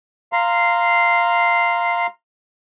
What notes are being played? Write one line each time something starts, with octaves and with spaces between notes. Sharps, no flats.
F5 A#5 C6